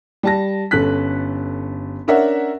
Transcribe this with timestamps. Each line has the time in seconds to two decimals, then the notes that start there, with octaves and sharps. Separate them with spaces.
0.23 G3 A5 A#6
0.71 G1 C#4 A4 F#6 B6
2.07 C#4 D4 A#4 C#5 E5 F#5